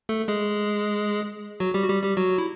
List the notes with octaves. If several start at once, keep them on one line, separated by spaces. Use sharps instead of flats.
A3 A4
G#3 G#4
F#3 F#4
G3 G4
F#4
G3 G4
G3 G4
F#3 F#4
E4